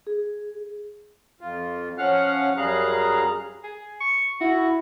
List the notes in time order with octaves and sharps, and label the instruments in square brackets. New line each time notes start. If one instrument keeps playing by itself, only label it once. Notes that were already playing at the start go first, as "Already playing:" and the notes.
[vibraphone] G#4
[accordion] F2 F4
F3 C#4 F5 F#5 F6 F#6
F#2 G3 G#4 F5 A#5 F#6
[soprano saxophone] G#4
C#6
[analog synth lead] E4 [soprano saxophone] F#4